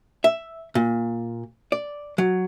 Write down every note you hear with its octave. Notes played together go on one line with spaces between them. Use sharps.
E5
A#2
D5
F#3